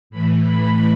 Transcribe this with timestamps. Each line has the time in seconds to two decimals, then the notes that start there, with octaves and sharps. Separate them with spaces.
0.10 A2 E3 B5
0.41 B5